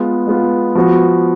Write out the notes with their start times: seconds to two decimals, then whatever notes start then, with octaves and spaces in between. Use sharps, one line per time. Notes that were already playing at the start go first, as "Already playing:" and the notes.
Already playing: G#3 B3 F4
0.27 G#3 B3 F4
0.75 F3 B3 F#4 B4